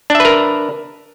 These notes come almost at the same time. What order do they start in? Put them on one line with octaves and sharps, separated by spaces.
D4 E5 B4 A#4